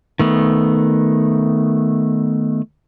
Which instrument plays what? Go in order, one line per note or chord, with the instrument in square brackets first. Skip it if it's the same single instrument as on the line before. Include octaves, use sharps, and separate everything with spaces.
[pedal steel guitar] D#3 A3 B3